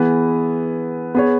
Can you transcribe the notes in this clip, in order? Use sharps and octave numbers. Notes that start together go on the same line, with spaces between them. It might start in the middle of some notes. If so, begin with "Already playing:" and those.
Already playing: E3 B3 G#4
B3 G#4 C#5